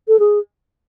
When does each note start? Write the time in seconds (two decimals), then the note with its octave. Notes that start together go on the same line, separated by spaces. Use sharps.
0.08 A4
0.19 G#4